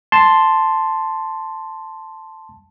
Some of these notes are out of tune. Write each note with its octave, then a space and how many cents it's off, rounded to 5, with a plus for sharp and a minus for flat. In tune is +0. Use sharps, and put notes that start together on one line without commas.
A5 +0 C6 +0